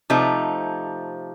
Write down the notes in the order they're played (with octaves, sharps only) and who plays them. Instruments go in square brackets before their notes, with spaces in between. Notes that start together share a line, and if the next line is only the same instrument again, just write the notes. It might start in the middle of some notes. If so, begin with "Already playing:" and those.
[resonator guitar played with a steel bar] C3 F3 A3 D#4